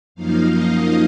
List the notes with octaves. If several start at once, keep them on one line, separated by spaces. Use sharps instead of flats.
F#2 F3 A#3 D#4 F5
D#5